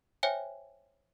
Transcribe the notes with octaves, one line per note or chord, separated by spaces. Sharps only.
C5 C#5 E5 G5 G#5